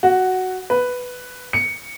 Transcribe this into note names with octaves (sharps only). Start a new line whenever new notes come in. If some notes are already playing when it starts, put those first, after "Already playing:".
F#4
B4
C#7